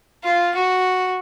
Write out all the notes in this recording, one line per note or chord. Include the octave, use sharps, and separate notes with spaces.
F4
F#4